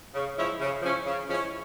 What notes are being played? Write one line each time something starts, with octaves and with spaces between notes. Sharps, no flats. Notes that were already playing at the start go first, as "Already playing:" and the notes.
C#3
F3 G#3 C#4 E4
C#3
F3 G#3 C#4 E4
C#3
F3 G#3 C#4 E4